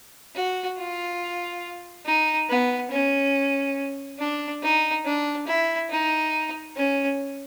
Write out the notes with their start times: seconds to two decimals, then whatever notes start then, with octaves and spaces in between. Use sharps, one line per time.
0.35 F#4
0.78 F4
2.06 D#4
2.49 B3
2.91 C#4
4.19 D4
4.62 D#4
5.05 D4
5.47 E4
5.90 D#4
6.76 C#4